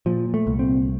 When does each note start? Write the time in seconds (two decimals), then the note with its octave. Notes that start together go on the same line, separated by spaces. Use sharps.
0.06 A#2 F3
0.34 A3
0.47 C2
0.59 C4